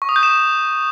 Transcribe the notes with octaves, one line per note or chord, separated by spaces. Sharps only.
C#6
D#6
G6
E7